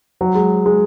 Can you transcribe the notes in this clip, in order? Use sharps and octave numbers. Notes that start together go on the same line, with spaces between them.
F#3
G#3
G#3